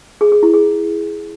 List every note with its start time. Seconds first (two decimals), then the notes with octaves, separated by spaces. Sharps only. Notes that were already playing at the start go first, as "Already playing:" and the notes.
0.21 G#4
0.32 G#4
0.43 E4
0.54 G#4